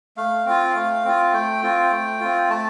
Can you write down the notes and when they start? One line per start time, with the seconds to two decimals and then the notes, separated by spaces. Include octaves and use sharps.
0.17 A3 F5
0.46 C4 F4
0.75 A3
1.05 C4 F4
1.33 A3 G5
1.63 C4 F4
1.91 A3
2.20 C4 F4
2.49 A3 A5